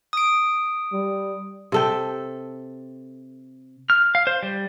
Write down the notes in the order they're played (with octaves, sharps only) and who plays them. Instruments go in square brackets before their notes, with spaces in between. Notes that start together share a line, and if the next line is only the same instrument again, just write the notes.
[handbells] D#6 D7
[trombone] G3
[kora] C3 A4 G5
[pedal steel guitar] F6
F5
C5
G3